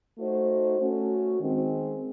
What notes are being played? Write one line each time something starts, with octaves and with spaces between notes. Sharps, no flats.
A3 D#4 F#4 C5
A3 C#4 F#4
D#3 G#3 C4